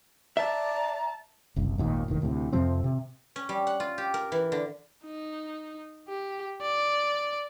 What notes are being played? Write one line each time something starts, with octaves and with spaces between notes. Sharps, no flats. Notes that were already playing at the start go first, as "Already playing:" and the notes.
D5 E5 A5 A#5
F#1 C2
G#1 D#2 A#2 D#3
E1 A1 D#3
D2 A2 C3
F2 C3 F3 C4
C3
C#4
G3
F#5
F4
G4
A#4
E3
D3
D#4
G4
D5